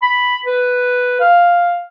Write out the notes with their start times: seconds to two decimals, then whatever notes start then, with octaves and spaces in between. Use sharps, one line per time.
0.03 B5
0.46 B4
1.21 F5